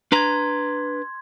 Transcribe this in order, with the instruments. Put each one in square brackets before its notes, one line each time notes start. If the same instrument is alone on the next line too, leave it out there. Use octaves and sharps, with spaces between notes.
[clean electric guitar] D4 B4 A#5 [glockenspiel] C6 G#6